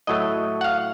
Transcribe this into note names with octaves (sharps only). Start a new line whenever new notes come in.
A2 F#3 A3 D#5
F#5
F5